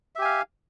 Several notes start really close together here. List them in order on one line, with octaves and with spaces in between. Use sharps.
E5 G4 G#5 F5